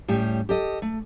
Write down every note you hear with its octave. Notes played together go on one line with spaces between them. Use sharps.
A2 G3 C#4 G4
G4 A4 D#5
A3